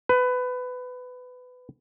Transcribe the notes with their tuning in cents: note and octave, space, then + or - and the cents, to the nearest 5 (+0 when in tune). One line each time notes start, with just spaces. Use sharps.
B4 +20